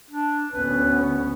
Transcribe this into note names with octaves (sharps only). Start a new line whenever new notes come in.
D4
D2 B3 C#4 B4